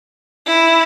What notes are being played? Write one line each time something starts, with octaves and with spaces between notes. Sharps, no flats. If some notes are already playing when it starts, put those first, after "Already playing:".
E4